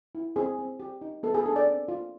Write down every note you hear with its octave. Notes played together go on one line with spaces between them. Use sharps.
E4
C4 G#4
C4
G4
D#4
B3 A4
G#4
D4 A4
D5
C4
F4